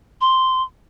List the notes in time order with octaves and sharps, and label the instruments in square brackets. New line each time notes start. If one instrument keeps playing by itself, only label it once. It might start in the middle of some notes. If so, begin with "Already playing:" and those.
[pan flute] C6